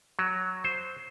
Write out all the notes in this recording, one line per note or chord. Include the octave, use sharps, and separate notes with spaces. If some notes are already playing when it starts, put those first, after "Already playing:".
F#3
C5